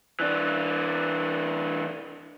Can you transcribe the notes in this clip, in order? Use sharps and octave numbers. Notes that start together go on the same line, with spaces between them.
E3 D4